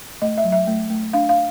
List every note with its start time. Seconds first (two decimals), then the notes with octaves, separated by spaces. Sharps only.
0.22 A3 D#5
0.38 E5
0.44 F#3
0.52 E5
0.67 A3
0.90 A3
1.13 D4 F5
1.29 F5